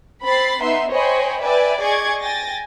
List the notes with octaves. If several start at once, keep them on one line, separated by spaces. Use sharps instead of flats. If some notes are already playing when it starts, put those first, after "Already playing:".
C4 B5 A6 C7
B3 D#4 E5 C6
C5 C#5 D#5 G5 G#5 B5
B4 D5 E5 G5 G#5
G#4 D5 D#5 C#6 G#6
G5 G#5 A6 A#6